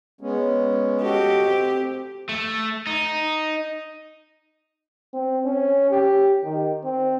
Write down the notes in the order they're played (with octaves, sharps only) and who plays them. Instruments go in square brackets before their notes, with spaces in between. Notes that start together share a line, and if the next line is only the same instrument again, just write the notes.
[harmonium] G#3 B3 C#4
[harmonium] F#4 A4 D#5 [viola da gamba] G4
[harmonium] C4
[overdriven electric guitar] A3
D#4
[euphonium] C4
C#4
G4
D#3
C4